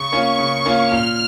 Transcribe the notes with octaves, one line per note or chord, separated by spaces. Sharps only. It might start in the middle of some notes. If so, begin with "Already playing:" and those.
Already playing: C#3 C#6
A#3 C#4 F4
C#3
A#3 C#4 F4
A#2 F6